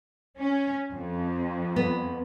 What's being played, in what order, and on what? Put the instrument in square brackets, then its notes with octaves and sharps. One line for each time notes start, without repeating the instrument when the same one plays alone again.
[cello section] C#4
F2
[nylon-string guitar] B3